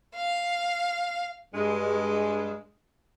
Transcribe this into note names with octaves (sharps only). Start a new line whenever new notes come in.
F5
G2 G#3